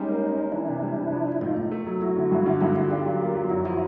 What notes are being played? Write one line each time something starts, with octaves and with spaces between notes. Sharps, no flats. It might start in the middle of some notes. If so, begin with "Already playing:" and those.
Already playing: G3 G#3 C#4 D#4
A#3
A#3
A#3
E3 D4 E4
C3
G3
C3
F3
F3
E4
A2 D#4 F4
A2
A3
F#3
A3 E4 F#4
D3
G2
D3
G2 E4 F#4
D3 E4 F#4
D4 F4 G4
F#3
A#3
F#3
F#2 E4 F#4
F3 E4 F#4